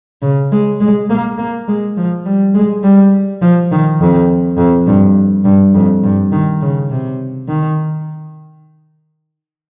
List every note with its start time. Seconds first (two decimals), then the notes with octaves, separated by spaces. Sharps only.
0.22 C#3
0.52 G#3
0.81 G#3
1.10 A#3
1.38 A#3
1.68 G#3
1.97 F3
2.26 G3
2.54 G#3
2.83 G3
3.42 F3
3.72 D#3
4.01 F2
4.58 F2
4.87 G2
5.45 G2
5.74 F2
6.03 G2
6.32 D#3
6.62 C#3
6.90 C3
7.48 D#3